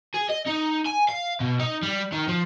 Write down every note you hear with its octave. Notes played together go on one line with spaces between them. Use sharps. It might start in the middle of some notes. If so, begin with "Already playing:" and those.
G#4
D#5
D#4
G#5
F5
B2
D#4
G3
D#3
F3